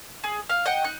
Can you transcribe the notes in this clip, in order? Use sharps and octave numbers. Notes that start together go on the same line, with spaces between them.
G#4
F5
D#5 F#5 G5
D#4 F#6